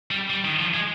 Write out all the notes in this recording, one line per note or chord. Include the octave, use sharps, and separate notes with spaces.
G3
G3
D#3
F3
G#3